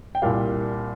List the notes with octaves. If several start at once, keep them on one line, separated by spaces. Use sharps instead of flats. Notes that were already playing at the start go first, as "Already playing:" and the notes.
G5
C2 A#2 G3 F5